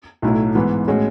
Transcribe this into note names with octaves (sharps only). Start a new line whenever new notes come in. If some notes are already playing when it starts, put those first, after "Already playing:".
B1 A2 F#3 A3 E4
G#2 E3 B3
A2 G#3 C#4 F#4